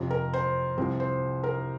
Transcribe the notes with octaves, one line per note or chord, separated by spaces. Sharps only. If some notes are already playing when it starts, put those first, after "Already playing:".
Already playing: F2 C3 F3
A#4
C5
C2 C3 F3 C5
C5
A#4